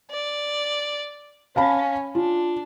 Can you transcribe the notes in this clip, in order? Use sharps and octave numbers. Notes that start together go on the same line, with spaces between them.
D5
C#4 F5 A5 B5
D4 F4